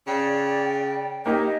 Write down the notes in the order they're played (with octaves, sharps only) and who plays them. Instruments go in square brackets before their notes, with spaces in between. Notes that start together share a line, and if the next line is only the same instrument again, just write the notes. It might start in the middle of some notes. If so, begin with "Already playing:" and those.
[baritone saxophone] C#3 [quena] D5 [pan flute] G5
[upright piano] A#3 D#4 G4 [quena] D#5